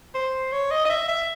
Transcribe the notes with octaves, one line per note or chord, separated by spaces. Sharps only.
C5
C#5
D#5
D#5
E5
E5